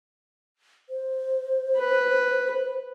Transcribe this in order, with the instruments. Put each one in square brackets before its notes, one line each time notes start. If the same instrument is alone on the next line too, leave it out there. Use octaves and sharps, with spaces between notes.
[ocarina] C5
[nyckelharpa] B4